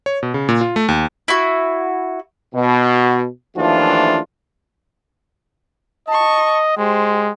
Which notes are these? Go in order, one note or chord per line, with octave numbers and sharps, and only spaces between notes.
C#5
B2
C#3
A#2
F4
A3
D#2
E4 F#4
B2
D#2 E3 F3 A3 D4 F4
D#5 A5 C#6
G#3 G4 C5